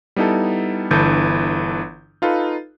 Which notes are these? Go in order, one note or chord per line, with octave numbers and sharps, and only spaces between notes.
G3 B3 D#4 E4 A4
G1 D3 E3 A4 G6
D#4 F4 A4 B4